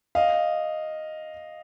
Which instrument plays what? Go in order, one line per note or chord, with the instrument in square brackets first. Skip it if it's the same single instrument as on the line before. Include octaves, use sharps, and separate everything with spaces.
[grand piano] D#5 F5